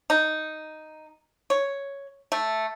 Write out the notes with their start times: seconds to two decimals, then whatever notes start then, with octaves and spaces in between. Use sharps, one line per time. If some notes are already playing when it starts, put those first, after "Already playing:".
0.10 D#4
1.50 C#5
2.32 A3